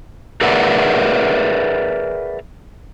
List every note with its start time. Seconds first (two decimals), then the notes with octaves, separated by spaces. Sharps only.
0.41 G#4 A#4 B4 D5 E5 F#5